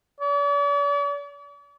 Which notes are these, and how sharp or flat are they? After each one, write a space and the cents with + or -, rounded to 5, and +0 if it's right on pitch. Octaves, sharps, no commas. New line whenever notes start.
D5 -45